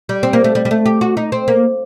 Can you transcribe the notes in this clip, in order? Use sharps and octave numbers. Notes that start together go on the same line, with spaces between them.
G3
C4
A#3
A3
G3
G3
A3
G4
F#4
D#4
C4
A#3